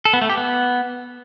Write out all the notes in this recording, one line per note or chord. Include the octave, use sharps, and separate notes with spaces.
A4
B3
A3
G4
B3